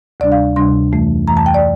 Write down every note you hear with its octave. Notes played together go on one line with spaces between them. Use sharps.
D2 C3 G3 D4 D5
F5
D2 C3 G3 D4 C6
F2 E3 A3
F2 E3 A3 A#5
A5
G5
D5